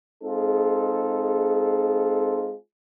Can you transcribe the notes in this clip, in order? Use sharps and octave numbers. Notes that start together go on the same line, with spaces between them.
G#3 C4 D#4 F4 G#4 A4